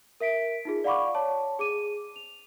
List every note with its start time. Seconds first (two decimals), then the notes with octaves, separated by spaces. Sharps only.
0.20 A#4 E5 B6 D7
0.65 D#4 F4 G#4
0.84 D5 F5 F#5 B5 C#6 D6
1.15 C#5 A5
1.59 G#4 D6 D#7
2.16 F7